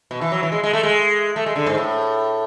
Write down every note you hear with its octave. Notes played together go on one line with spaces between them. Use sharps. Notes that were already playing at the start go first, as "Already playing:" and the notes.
B2
E3
F#3
E3
G#3
G#3
A3
G#3
A3
G#3
D3
G#2
A2